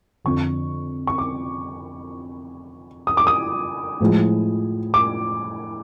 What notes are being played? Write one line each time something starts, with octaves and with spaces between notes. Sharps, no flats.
F2 D3 F3 C#6
C#6
D6
D#6
D6
D#6
A2 F3 G#3
D6